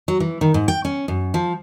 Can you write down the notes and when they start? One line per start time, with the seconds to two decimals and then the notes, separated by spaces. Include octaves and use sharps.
0.08 F#3
0.20 E3
0.41 D#3
0.54 G#2
0.68 G5
0.85 C#4
1.08 F#2
1.34 F3